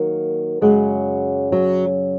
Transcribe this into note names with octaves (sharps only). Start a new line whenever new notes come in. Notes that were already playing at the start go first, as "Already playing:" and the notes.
Already playing: D#3 F#3 A#3
F#2 C#3 F#3 G#3
F#3